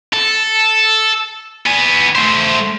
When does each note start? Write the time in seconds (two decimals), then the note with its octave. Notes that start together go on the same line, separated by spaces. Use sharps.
0.13 A4
1.66 B3 G#5
2.15 A3 C5